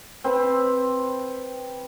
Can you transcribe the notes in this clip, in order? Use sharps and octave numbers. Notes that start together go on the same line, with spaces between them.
C4 B4